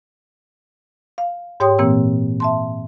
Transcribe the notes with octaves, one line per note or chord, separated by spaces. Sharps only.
F5
G#2 G4 C#5 G5 C6 D#6
A#2 E3 A#3 C4 E6
E5 A5 C6